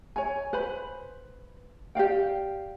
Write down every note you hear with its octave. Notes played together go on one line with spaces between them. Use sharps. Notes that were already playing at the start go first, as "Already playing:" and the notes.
C#5 G#5
B4 C5 B5
G4 D5 F5 G5